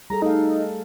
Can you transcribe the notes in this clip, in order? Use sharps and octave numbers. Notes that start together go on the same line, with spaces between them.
G3 G#4 A4 A#5
A3 D#4 A4 F5